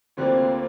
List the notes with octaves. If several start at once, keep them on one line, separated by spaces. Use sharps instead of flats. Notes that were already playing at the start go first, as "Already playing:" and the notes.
D2 D3 G3 A#3 C4 F4